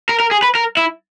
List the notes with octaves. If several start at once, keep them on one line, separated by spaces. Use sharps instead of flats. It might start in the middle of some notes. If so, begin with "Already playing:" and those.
A#4
A#4
G#4
B4
A#4
E4